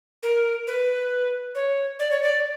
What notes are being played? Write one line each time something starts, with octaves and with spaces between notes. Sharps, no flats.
A#4
B4
C#5
D5
C#5
D5